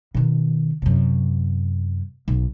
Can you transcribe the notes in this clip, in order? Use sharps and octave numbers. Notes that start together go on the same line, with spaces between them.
B2 D#3
F#2 C3
B1